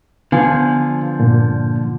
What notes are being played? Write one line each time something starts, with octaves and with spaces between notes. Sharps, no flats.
D3 F3 B3 F5 G#5
G2 A#2